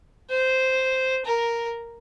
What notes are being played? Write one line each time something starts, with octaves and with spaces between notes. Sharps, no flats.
C5
A#4